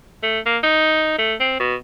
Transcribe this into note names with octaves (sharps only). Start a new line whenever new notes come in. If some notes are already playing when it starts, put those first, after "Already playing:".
A3
A#3
D#4
A3
C4
B2